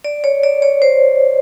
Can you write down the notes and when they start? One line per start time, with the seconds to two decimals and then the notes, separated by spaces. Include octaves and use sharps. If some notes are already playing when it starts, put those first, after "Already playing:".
0.04 D5
0.24 C#5
0.43 D5
0.62 C#5
0.82 C5